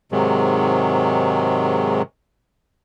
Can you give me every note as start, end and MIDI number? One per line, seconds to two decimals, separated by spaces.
0.12 2.02 44
0.12 2.02 48
0.12 2.02 51
0.12 2.02 54
0.12 2.02 56